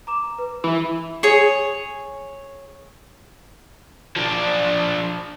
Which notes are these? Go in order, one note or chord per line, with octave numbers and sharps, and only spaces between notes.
A#5 D6 E7
B4
E3 E5 B5
G#4 C#5
F3 D4